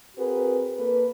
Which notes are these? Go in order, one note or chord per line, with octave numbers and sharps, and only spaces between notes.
C4 F#4 G#4 A#4 B4
A#3 A4 B4